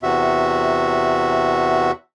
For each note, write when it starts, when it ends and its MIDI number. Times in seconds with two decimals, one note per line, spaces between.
0.03 1.91 40
0.03 1.91 48
0.03 1.91 66
0.03 1.91 76